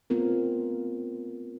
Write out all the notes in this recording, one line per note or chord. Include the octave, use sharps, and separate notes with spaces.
A3 B3 C4 F4 A#4